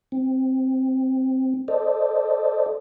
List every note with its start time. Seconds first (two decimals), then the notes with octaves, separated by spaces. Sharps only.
0.12 C4
1.68 A4 C5 D5 D#5